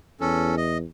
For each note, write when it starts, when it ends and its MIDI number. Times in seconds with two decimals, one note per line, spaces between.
0.21 0.84 40
0.21 0.55 61
0.21 0.55 69
0.57 0.78 75